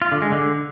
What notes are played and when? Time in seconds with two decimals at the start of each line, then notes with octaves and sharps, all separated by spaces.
0.02 F4
0.12 D3
0.22 G#3
0.32 D3